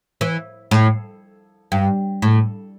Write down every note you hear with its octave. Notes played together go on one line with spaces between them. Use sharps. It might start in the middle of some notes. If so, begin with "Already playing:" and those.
E3
A2
G2
A2